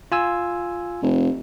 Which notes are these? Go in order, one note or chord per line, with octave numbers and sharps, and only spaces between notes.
F4 G#5 E6
F1